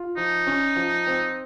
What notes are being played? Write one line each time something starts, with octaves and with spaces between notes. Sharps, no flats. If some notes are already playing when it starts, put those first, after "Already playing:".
Already playing: F4
F3 D#4
C#4
F3
C4